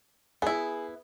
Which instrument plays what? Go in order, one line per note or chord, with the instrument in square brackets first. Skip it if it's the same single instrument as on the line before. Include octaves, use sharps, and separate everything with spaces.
[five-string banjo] B3 E4 [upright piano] G#4